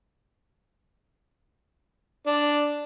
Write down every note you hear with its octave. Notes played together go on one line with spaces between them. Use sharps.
D4